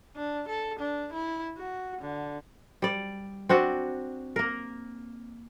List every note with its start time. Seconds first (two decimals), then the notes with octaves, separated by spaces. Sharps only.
0.16 D4
0.49 A4
0.79 D4
1.13 E4
1.57 F#4
2.01 D3
2.82 G3 D5
3.49 C4 D4 F#4
4.36 A#3 A#4